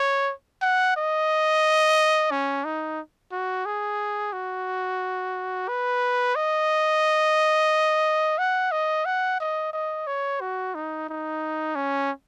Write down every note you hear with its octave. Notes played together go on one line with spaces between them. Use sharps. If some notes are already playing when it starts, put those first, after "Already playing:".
Already playing: C#5
F#5
D#5
C#4
D#4
F#4
G#4
F#4
B4
D#5
F#5
D#5
F#5
D#5
D#5
C#5
F#4
D#4
D#4
C#4